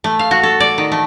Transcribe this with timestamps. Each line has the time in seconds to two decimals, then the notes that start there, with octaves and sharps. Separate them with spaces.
0.04 A3
0.19 F5
0.31 F#4
0.43 A4
0.60 D5
0.78 D#3
0.92 A3